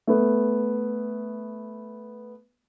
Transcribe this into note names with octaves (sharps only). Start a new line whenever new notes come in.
A3 B3